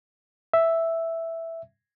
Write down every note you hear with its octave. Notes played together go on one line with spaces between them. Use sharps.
E5